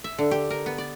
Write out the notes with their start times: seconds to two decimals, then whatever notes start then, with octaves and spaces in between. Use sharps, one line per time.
0.04 E5
0.19 D3
0.31 G4
0.50 A#4
0.66 B3
0.78 D5